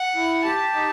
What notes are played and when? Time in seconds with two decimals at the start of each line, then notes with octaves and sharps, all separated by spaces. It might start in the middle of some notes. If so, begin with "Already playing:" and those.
Already playing: F#5
0.16 E4
0.44 G4 A5
0.74 D#4